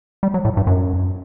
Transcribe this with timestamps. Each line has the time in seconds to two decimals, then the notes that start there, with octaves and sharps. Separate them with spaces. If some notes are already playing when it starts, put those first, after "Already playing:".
0.23 G3
0.34 F#3
0.45 A2
0.57 G2
0.67 F#2